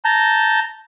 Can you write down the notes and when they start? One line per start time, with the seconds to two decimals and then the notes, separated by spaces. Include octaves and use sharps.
0.05 A5 A#5 G6